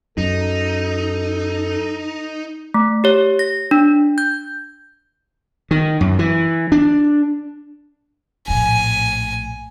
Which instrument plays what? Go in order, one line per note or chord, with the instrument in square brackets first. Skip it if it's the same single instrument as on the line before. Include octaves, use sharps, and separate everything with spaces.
[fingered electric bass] F#2 [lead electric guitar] D#4 [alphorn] A4
[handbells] A3
G4 C#5
A#6
D4
G6
[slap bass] D#3
F#2
E3
D4
[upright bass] A#1 A2 [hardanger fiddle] G#5